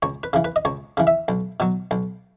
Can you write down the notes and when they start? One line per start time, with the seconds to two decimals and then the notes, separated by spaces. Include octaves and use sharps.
0.02 C#2 C#5
0.23 B4
0.33 C#3 E3
0.45 B4
0.56 D#5
0.65 C#2 C#5
0.97 C#3 E3
1.07 E5
1.28 B1
1.60 B2 F#3
1.91 B1